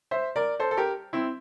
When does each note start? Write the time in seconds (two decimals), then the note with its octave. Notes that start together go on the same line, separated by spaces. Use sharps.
0.11 C5 E5
0.36 A#4 D5
0.59 A4 C5
0.71 A4
0.77 G4 A#4
1.13 C4 E4